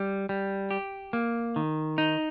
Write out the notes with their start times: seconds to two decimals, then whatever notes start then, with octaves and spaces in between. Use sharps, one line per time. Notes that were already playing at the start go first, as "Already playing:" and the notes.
Already playing: G3
0.29 G3
0.71 G4
1.13 A#3
1.56 D#3
1.98 D#4